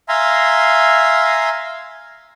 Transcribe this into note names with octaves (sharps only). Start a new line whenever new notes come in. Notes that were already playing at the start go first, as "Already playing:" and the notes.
E5 F5 G#5 A#5 C6